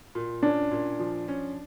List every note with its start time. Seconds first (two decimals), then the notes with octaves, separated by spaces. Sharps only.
0.15 A#2
0.43 C#4 D4
0.71 A#2
1.00 F3
1.28 C#4